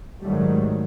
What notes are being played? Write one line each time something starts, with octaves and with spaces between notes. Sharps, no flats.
G#2 D#3 F#3 G3 A3